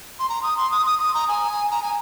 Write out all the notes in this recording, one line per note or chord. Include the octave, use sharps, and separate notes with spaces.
C6
A#5
D#6
C6
D#6
D#6
D#6
A#5
G#5
A#5
G#5